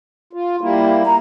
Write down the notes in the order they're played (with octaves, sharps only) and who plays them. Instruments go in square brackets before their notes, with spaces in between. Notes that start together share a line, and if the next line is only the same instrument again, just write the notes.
[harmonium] F4
G3 A#3 E4
[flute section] A#5